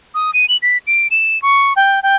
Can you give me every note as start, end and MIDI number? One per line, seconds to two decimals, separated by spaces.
0.14 0.31 87
0.34 0.46 99
0.49 0.57 102
0.62 0.78 95
0.87 1.08 98
1.11 1.41 100
1.42 1.73 85
1.76 2.02 79
2.03 2.16 79